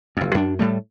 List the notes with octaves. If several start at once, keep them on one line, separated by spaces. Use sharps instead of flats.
F#1 F2
F#2 D4
A2 G3 A3